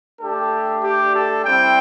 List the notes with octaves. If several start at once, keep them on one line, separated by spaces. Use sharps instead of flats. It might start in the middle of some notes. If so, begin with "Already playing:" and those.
A3 D4 G4 A4
G4
A4
G3 C4 E4 G5